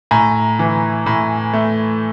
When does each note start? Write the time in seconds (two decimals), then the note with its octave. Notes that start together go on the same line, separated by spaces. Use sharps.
0.11 A2 G#5 A#5
0.59 E3
1.06 A2
1.53 A3